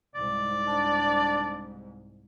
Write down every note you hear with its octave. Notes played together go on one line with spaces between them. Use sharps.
C2 G#2 D5
D4